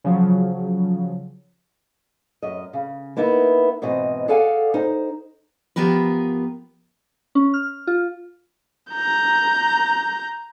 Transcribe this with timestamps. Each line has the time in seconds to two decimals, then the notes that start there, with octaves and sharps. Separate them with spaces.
0.04 C#3 F3 F#3
2.42 F#2 D#5
2.73 C#3
3.17 A#3 B3 D#4 E4
3.82 G#2 B2 E3 C4 D#5
4.28 G#4 A4 D5 F5 F#5 G#5
4.74 D#4 C5
5.76 F3 B3 G4 A#4 B4
7.35 C#4
7.54 F6
7.87 F4
8.90 A#5 G6